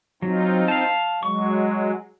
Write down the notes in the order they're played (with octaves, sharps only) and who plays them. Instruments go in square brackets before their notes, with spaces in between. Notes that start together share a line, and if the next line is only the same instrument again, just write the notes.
[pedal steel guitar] F#3 [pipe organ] C4 D#4 F4
[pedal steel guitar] F5 A5
[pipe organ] F#3 G#3 [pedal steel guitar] C#6